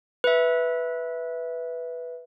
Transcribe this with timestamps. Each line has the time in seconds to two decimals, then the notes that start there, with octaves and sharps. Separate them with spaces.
0.24 B4 E5